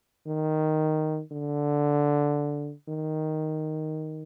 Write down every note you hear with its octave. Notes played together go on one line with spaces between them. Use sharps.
D#3
D3
D#3